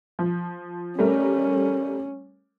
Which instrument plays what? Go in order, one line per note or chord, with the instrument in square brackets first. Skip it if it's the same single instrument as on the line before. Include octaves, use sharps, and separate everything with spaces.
[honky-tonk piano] F3
[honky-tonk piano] G3 A3 A#4 [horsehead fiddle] C#4